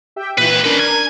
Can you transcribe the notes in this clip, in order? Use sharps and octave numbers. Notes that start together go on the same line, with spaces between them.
G4 E5 G5
D#2 A#2 E3 B4
C#4 D4 A#4 B4
G#5